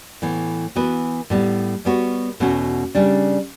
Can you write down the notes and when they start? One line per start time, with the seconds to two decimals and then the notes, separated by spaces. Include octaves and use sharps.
0.22 A2 E3 B3
0.76 E3 B3 F#4 B4
1.30 A2 G3 B3
1.85 G3 B3 F#4 C#5
2.40 E2 B2 A3 C#4 F#4
2.95 C#3 G3 D4